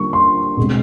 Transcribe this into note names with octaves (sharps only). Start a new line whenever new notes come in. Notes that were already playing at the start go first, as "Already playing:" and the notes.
Already playing: D3 G3 A#3 D4 C#6
C6
B2 G#3 C4